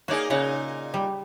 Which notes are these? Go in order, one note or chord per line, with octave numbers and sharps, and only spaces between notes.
A#3 D#4 F#4 G#4 C#5 D5
A#2 C#3 D#4 C#5 F#5
G3